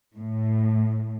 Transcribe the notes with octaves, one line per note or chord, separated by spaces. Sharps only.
A2